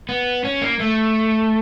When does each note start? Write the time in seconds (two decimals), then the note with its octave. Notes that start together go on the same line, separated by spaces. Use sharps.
0.09 B3
0.44 C#4
0.62 A#3
0.80 A3